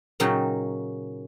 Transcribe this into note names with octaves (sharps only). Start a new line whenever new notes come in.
A#2 C#3 F#3 D#4 G5